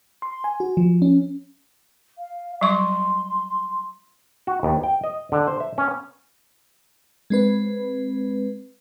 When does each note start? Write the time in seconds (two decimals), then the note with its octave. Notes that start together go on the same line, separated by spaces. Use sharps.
0.22 C6
0.44 G#5
0.60 F#4
0.77 F3
1.02 C#4
2.18 F5
2.61 F#3 G3 C6 C#6
4.47 F#4
4.63 D#2
4.83 G5
5.04 D#5
5.32 D3
5.47 C5
5.60 E5
5.78 C#4
7.30 G#3 C4 B4